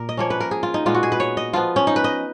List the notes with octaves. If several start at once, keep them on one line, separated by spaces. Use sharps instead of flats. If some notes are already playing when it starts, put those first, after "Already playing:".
Already playing: A#2 A#4
D#5
F3 A#3 C#4 C#5
B4
A#4
G#4
F4
D#4
A#2 G#3 B3 F4
F#4
G#4
B4
C#5
D#5
F3 B3 F4
C#4
D#4
B4
D#5